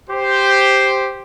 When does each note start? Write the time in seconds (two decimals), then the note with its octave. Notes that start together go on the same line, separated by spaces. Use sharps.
0.10 G4 C5